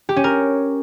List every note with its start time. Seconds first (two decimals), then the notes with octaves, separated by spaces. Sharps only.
0.09 G4
0.16 C#4
0.24 A#4